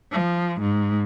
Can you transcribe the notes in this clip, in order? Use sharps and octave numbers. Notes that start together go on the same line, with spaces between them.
F3
G#2